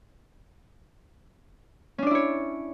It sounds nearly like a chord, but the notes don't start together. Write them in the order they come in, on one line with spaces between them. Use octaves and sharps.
C#4 D4 D5 E4 C#5